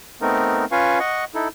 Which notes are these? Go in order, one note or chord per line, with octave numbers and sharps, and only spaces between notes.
A3 B3 C4 D#4 A#4
C#4 F4 B4 F5 G#5 C#6
D#5 F#5 C#6
D#4 E4 A4